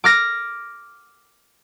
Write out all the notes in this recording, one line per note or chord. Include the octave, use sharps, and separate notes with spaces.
D6 F6 A#6